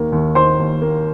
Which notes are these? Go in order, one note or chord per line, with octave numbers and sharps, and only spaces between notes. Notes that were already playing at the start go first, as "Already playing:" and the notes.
Already playing: D#2 D#3 A#3
D#2
D#3 C5 C6
D#2
A#3